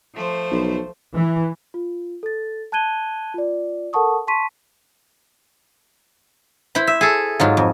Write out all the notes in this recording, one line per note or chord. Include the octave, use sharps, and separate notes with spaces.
F3 A3 C5
B1
E3
F4
A4 A6
A5 F#6 G#6 D#7 G7
F4 D5
A4 A#4 F#5 A5 C#6 D#6
A5 C6 C#6 B6 D#7
E4 C5 B5
E5
G#4 A4
G#2 F#3 F4
F2